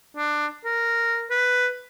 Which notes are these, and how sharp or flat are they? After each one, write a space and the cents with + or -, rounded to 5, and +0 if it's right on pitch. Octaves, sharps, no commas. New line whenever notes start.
D4 +20
A#4 -5
B4 +5